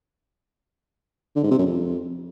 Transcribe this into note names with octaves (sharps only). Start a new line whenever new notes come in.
D3
G#2
C3
F#2
F2